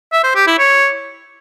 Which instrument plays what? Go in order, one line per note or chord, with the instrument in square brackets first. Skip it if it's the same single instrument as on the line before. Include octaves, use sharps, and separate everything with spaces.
[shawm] E5
C5
G4
E4
C#5